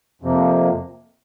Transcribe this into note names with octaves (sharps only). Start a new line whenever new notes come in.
F2 C3 F3 A#3